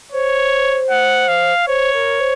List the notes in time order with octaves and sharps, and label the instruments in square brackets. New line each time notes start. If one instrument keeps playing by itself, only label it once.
[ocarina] C5 [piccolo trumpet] C#5
[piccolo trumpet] F#5
F5
[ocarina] C5 [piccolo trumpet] C#5
[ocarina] A#4
C5